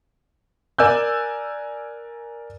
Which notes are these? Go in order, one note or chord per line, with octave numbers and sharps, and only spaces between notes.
A#4 D5 G#5 E6 F#6 G6